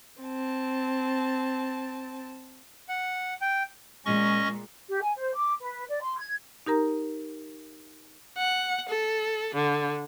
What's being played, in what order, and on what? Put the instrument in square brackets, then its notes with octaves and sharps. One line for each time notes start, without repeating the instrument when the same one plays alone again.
[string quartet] C4 A5
[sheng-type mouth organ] F#5
G5
[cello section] A#2 G#3 [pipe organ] C#4 D#5 C#6
[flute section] G4
G#5
C5
D6
B4
D5
C6
G#6
[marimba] D#4 G4 A#4 A#5
[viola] F#5
A4
D3